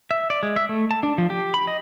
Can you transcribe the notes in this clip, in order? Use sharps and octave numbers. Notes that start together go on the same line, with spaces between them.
E5
D5
G#3
E5
A3
A5
D4
F3
G4
B5
D#5